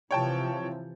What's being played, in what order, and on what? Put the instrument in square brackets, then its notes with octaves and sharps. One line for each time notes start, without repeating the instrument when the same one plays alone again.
[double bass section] C3 E3 F3 [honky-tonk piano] C#5 G5 A5